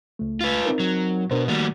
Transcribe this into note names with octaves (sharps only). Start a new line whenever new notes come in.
C#2 A3
F4 B4
C4 D#4 A#4
F#3
B2 D4 A#4 C5
D#3 G3 A3 A#3 F#4